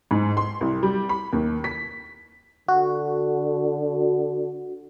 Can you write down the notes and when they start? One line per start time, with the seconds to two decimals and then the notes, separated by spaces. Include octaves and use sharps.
0.11 G#2
0.37 C6
0.61 C2
0.83 G3
1.09 B5
1.33 D#2
1.64 B6
2.68 D3 F#4